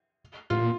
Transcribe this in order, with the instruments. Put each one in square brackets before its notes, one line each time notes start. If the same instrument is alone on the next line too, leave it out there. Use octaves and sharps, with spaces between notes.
[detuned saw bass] A2 [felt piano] F4
[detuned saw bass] A#2